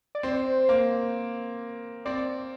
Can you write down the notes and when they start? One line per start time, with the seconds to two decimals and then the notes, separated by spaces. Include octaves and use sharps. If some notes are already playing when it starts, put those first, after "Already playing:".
0.15 D5
0.23 C4 C5
0.69 A#3
2.05 C4 D5